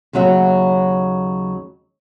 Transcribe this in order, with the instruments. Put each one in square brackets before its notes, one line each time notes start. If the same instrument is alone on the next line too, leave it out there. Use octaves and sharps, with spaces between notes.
[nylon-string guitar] D#2 C#3 F#3 F#4 E5